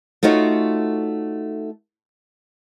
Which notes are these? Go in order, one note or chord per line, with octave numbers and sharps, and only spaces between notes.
A3 D#4 F4 F#4 C#5